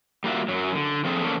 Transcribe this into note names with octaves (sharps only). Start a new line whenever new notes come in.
G3 A#3 F4 F#4 E5
F#2 F#3
D3
F3 A3 C4 G#4 A4
E2 A#3 C#4 A4